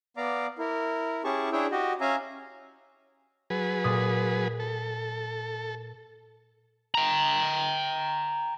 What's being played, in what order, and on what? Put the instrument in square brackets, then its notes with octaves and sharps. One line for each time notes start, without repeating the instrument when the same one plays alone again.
[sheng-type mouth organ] B3 D5 F5 A#5 D6
E4 A#4
C#4 E4 G4 G#4 A5 C#6
D4 E4 G#4 C#5 E5 G5
F#4 G4 D#5
C#4 E5 F5 G#5 A#5
[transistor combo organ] F#3 G#4 B4
[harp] A#2 D#6
[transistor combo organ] A4
[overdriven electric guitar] G5 A#5